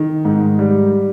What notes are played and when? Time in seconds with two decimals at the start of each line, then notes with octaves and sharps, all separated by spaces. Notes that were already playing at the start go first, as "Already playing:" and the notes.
Already playing: D#3
0.25 G#2
0.59 G3